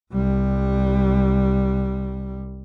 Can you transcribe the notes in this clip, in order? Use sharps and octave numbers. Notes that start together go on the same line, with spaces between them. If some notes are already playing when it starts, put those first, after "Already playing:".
C2 G3